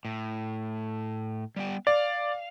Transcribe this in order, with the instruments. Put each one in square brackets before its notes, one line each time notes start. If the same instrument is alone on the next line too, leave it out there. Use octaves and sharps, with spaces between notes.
[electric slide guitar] A2
G3 B3 G5
[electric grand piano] D5 [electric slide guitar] F5